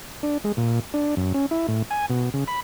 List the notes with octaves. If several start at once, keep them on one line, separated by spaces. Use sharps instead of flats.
D4
G#3
A#2
D4
F#2
C#4
E4
A2
G#5
B2
C#3
B5